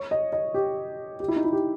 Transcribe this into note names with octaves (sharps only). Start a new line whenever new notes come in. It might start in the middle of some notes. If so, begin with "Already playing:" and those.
Already playing: C#5
D#5
D#5
G4
G4
E4
D#4
E4
G4